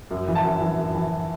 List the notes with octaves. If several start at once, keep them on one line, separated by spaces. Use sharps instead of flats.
F#2
E3
A5
F#2
E3
F#2
E3